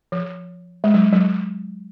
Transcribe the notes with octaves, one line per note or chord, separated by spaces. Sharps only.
F3
G#3
F#3
F#3